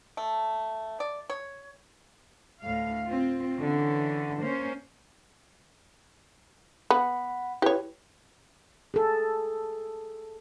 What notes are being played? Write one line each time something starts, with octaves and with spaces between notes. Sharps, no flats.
A3
D5
C#5
D2 A2 F5
C4 F4
D3 E3 C#4
A#3 C#4 C5
B3 F#5 B5
E4 G4 B4 C#5
G#4 A4